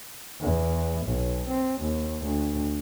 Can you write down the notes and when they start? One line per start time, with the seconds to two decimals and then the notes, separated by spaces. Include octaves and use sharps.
0.41 E2
1.06 B1
1.48 C4
1.81 D#2
2.23 D2